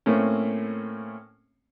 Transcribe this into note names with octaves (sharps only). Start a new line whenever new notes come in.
A2 A3 A#3 C4 C#4